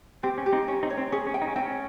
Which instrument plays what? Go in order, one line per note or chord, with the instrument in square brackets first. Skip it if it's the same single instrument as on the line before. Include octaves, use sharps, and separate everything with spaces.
[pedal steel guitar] C4 [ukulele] G4
[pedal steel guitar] C#4
[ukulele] G4
[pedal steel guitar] C4 D#4
[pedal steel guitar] C#4 [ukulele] C#5
[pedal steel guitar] C4 D#4
[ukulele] C#5
[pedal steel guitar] C4
[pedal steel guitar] C#4 [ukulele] G#4
[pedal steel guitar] C#4
[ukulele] G5
[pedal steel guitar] D#4
C#4
[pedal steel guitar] C4 [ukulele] G5
[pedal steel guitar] C#4